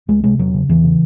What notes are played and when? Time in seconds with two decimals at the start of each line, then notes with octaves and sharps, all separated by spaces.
0.08 C#2 G#3
0.24 C3 G#3
0.39 E2 F#3
0.54 C#3
0.69 E2 E3
0.84 C#3